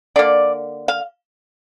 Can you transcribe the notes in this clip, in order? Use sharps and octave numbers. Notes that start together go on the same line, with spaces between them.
D3 A#3 D5
F5